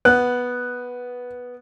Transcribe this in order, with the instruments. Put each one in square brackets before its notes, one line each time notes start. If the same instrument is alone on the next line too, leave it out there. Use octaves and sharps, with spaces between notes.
[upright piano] B3 [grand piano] F#6